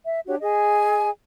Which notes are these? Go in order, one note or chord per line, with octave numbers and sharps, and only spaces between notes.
E5
D4 F#4 G4 C#5
G#4 D#5 G#5